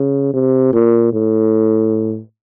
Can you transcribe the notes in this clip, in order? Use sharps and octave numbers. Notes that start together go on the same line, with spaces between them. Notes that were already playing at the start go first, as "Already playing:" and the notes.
Already playing: C#3
C3
A#2
A2